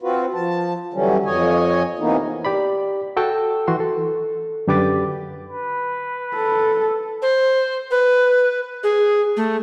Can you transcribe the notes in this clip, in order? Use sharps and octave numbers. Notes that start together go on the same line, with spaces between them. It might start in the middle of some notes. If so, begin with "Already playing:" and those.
C4 F4 F#4 B4
F3 A5
D3 E3 F#3 G3 C#4
F2 C#5 D#5 G#5
C3 E3 A#3 B3 D#4
G4 D5 B5
F#4 A4 G5 A5 E6
E3 F#4 C6
A4
F#2 D3 G4 B4 D6 A6
B4
A4
C5
B4
G#4
A3